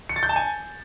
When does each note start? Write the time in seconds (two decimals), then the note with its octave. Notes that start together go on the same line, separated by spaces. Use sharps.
0.09 C#7
0.16 A6
0.23 G6
0.29 A5
0.36 G#5